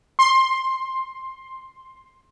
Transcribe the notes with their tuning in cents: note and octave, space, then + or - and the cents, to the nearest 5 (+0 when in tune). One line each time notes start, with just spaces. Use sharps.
C6 +10